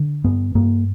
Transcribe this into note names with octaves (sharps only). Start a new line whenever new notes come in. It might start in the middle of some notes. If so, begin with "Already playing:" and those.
Already playing: D3
G2 B3
G2 A#3